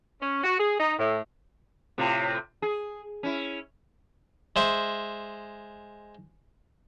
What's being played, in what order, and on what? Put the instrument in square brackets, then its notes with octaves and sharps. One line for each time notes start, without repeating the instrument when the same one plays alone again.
[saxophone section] C#4
F#4
G#4
D#4
A2
[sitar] A2 C3 F4
G#4
C#4 E4
[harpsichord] G#3 C5 E5